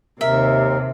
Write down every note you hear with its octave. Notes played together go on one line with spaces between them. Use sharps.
D#2 C3 A#4 E5